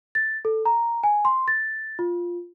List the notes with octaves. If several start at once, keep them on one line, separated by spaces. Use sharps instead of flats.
A6
A4
A#5
G#5
C6
A6
F4